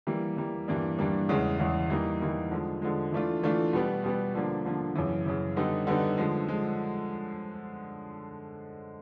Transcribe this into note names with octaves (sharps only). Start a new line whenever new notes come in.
E3 G3 A#3
E3 G3 A#3
G2 E3 G3 A#3 D4
G2 E3 G3 A#3 D4
E2 C#3 E3 G#3
E2 C#3 E3 G#3
E3 G3 A#3 D#4
E3 G3 A#3 D#4
D3 F3 G#3
D3 F3 G#3
E3 A3 D4 F4
E3 A3 D4 F4
B2 G3 B3
B2 G3 B3
D3 F3 A#3 D4
D3 F3 A#3 D4
F#2 C#3 E3
F#2 C#3 E3
D3 G3 B3 D#4
D3 G3 B3 D#4
D3 F3 G#3
F3 G#3